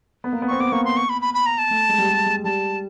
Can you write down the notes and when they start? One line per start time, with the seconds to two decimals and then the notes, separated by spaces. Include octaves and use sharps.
0.24 B3
0.33 A#3
0.42 B3
0.48 C4 C#6
0.60 B3 D6
0.72 A#3 C#6
0.85 C6
0.97 C#6
1.09 B5
1.21 B5
1.34 B5
1.46 A#5
1.58 A5
1.71 A3
1.89 G#3
1.98 G3
2.08 G3
2.26 G#3
2.44 G3 A5